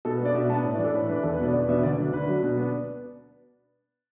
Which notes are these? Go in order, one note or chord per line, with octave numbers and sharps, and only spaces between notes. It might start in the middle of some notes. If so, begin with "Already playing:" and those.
B2 A4
B4
B3 D4 D5
B2 E5
B3 D4 A5
A2
D5
E3 D4 A4
A2 B4
E3 D4 B4
E2 A4
B4
B2 B3 D4 D5
E2 D5
B2 B3 D4 E5
D2 D5
D3 F#3 D4
D2 B4
D3 F#3 D4
B2
B3 D4